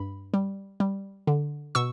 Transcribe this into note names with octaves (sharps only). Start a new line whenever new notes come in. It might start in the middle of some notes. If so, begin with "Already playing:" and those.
Already playing: G2 B5
G3
G3
D3
B2 C#6 E6